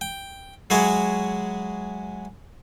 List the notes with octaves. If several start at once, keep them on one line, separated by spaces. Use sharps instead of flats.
G5
F#3 G#3 E4 F#4 G#4 C#5